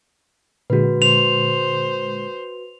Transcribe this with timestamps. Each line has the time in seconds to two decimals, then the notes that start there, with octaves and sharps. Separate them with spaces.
0.70 A#2 D3 G#3 F#4 B4
1.02 C5 F7